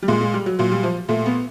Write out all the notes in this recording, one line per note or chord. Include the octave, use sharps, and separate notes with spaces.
G3
A#2 G#3
G#3
G3
F#3
A#2 F#3
G3
F3
A#2 A3
B3